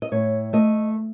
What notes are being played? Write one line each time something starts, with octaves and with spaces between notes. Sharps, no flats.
D#5
A2 C#5
A3 D#5